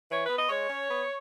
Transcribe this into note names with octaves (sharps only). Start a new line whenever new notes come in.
E3 C#5
B4
B3
D#5
G#3 C#5
C#4
B3